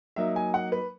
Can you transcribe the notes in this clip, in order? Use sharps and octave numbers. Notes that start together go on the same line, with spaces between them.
F#3 A#3 D#4 E5
G#5
F#5
B4